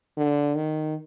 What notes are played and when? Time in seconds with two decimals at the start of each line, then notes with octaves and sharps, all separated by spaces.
0.17 D3
0.55 D#3